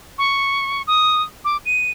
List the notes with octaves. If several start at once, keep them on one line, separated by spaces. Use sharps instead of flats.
C#6
D#6
D6
D#7